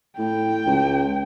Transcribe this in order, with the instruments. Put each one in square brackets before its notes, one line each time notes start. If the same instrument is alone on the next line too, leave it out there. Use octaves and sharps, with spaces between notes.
[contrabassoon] A2 [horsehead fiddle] G5
[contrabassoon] C#2